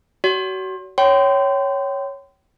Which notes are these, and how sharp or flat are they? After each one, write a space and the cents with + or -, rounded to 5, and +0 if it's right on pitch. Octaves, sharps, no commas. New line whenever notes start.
F#4 +35 C#5 +45
C#5 +0 G5 -30 C6 -35